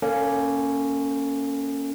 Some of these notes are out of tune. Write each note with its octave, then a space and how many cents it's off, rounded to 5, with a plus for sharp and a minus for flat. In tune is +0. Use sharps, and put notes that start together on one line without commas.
A#3 +0 C#4 +0 A4 +30